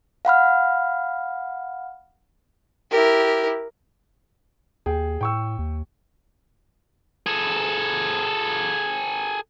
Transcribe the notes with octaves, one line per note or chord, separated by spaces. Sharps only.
F5 F#5 B5 F6
E4 G4 A#4
D#2 G#4 G5
A2 G5 C#6 E6
D#2
G#4 A4